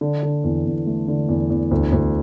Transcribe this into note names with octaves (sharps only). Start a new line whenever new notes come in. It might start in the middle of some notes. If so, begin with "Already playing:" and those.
D3
D3
E2
E2
A3
D3
E2
E2
D2
D2